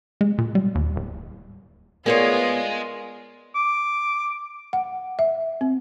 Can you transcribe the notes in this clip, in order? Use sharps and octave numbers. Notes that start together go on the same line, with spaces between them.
G#3
A#2
G3
D#2
D1
G#3 B3 F4 G#4 A#4 C#5 D5 C7
D6
F#5
E5
C4